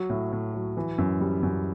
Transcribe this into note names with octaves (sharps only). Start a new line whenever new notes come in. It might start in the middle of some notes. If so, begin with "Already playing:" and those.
Already playing: F#3
A2
A2
F#3
E3
F#2
G3
F#2